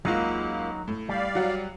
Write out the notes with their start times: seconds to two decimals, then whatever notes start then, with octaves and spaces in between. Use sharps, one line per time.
0.05 C#2 F#3 A#3 D#4 F4 F#4
0.88 A2
1.09 G3 D5 F5
1.35 F#3 F#4